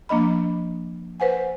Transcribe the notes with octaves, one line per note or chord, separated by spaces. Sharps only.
F3 A#3 D4 D#5 B5
B4 C5 F#5 G#5